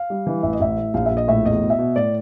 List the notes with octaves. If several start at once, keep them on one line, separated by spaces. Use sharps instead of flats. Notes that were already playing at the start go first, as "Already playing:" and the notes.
Already playing: F5
G3
E3
A1 E5
D#5
A1 E5
A2
A#1 F5
E5
A#1
D#5
A2 E5
E2 D#5
B2
E5
B2
A2 D5